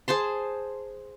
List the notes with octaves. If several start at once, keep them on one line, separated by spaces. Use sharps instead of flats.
G#4 C5 A5 C6